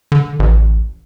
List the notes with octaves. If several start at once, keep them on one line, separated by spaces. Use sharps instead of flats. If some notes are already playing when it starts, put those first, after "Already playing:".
D3
A1